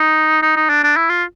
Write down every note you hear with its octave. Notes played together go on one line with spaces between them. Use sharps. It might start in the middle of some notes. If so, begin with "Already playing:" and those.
Already playing: D#4
D#4
D#4
D4
D4
E4
F4